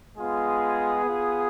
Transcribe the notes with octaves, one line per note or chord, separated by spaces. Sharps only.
G#3 B3 F4 G#4
B3 F4